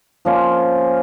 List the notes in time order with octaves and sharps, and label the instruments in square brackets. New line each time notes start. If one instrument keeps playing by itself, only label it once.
[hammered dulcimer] F3 A#3 C#4 F4